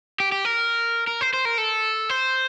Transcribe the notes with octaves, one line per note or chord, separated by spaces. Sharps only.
G4
G4
A#4
A#4
C5
C5
A#4
A4
C5